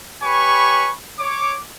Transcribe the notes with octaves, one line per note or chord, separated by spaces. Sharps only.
G4 B4 C#5 G#5 B5 C#6
C#5 D6